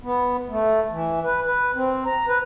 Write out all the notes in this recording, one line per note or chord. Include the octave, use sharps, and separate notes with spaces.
B3
A3
E3
B4
B4
C4
A#5
B4